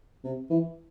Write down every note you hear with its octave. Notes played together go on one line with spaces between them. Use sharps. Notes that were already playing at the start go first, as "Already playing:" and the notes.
C3
E3